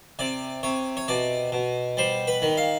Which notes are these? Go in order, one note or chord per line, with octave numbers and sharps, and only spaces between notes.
C3 D5
C3 C#5
C#5
B2 D5
B2
G3 C5
B4
D#3
F5